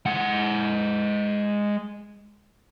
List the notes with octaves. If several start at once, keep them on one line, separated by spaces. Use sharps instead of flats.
G#3 F#5